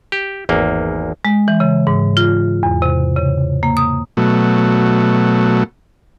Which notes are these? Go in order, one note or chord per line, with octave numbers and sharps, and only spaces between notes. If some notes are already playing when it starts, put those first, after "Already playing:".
G4
G#1 E2 A#3
G#3
E3
C#3
G#2
F4
E2
C3
C#3
A#3
D#6
B2 F#3 A3